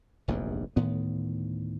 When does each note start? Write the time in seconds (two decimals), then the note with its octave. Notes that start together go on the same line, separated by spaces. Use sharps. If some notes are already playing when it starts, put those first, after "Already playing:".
0.28 F1 A#1 E2 G2
0.76 D2 A2 D#3 B3